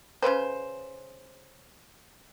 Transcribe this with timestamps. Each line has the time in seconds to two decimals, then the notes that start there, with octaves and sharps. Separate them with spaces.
0.22 C#3 A#3 B4 C5